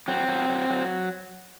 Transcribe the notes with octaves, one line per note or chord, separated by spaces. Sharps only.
F#3 C4
F#3
F#3
F#3